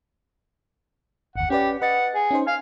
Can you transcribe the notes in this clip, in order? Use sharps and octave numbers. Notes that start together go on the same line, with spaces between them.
G1 D#2 F#5
C#4 G4 B4 D5
B4 D#5 F#5 A6
G#4
C#4 D#4 C5
F5 G#5